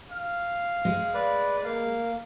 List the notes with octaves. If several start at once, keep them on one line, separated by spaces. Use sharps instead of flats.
F5
G#3
B4 D5
A#3 F5